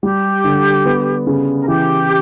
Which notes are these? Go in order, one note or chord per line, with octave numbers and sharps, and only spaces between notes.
G3 G4
D3
B3
C#3
A#4
E3 G4